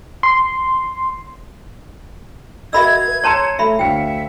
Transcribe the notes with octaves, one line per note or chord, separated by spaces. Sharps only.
C6
F#4 A#4 D#5 E5 B5 E6 G#6
B4
C#5 A5 A#5 C6 E6 C#7
A3 E5 B5
D2 E5 F5 G5 C#7